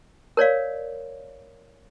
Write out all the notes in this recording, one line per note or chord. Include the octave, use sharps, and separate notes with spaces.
A#4 C#5 D5 F5